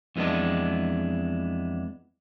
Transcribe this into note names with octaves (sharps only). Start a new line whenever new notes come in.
F2 E3 G#3 B3 D4